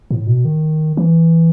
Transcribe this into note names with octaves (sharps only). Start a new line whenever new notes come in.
A2
B2
D#3
E3